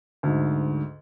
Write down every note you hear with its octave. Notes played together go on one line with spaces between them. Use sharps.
D2 G#2